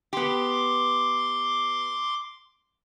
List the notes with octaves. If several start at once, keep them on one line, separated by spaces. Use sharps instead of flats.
B3 G4 C6 D6